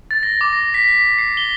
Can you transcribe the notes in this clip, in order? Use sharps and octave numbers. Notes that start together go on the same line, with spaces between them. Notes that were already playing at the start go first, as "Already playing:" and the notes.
A6
A#6
D6
A#6
B6
B6
C7
G7